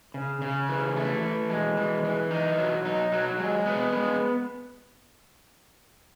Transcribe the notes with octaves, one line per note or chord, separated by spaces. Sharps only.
C#3
C#3
E3
A3
E3
G#3
E3
E3
D#4
F#3
D#4
F#3
G#3
B3
G#3